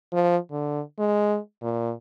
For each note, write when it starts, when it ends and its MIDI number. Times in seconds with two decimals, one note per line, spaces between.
0.13 0.37 53
0.51 0.81 50
0.99 1.38 56
1.62 1.93 46